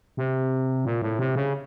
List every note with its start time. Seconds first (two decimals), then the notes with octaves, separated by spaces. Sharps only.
0.17 C3
0.85 A#2
1.02 A2
1.19 C3
1.35 C#3